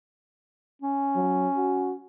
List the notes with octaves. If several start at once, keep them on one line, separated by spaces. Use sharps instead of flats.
C#4
F#3
F#4